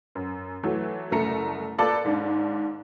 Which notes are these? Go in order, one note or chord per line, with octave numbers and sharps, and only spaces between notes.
F#2
E3 F#3 A3
F#1 C2 A3 A#5 C#7
A#3 F4 A4 B4 D5 A5
D#2 G#2 D4